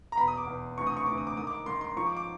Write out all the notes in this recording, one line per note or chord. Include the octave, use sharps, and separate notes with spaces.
A#5
E2 B2 B5
D#6
D6
E2 B2
D2 C3 E3 C#6
D#6
C#6
D2 C3 E3 D6
D#6
D6
G#2 D#3 D#6
D6
G#2 D#3 C6
C6
G#2 F3 C#6
D6
D6